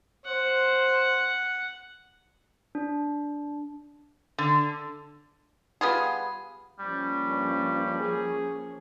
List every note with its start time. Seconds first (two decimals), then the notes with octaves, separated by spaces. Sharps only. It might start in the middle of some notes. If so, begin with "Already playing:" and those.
0.26 C5 F#5
2.75 D4
4.38 D3
5.81 G3 B3 F4 G#4
6.79 F3 G3 A#3 C#4
7.29 G2
7.99 G#4